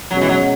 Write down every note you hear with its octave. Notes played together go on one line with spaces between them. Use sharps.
B2 F#3 G#3 C#4 F#4
E3
F#3